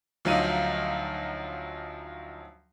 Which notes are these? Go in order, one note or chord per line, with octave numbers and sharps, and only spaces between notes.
D2 F3 F#3 D#4 F5 D#7